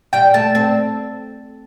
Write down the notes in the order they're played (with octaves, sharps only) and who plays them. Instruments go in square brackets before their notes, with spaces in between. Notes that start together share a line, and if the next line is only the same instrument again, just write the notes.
[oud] G3 [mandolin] G5
[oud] A3 [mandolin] A5
[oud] C4